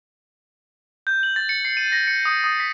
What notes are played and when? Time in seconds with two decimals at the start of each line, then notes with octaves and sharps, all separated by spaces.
1.07 G6
1.23 F#7
1.36 A6
1.49 C#7
1.65 C7
1.77 D#7
1.92 A#6
2.07 C#7
2.25 D#6
2.44 D#6
2.60 B6